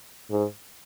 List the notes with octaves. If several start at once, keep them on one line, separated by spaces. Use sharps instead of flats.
G#2